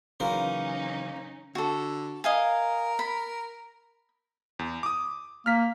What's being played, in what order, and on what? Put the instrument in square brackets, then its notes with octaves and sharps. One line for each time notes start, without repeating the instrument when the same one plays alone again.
[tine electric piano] C#3 E3 F#3 [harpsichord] A#3 A#4 C5 [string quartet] C#4 D#4
[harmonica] D3 [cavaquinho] F#4 A4
[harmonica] A#4 [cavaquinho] D#5 F5 G#5
[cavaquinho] B5
[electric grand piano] E2
D6 D#6
[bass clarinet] A#3 [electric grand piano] F6 B6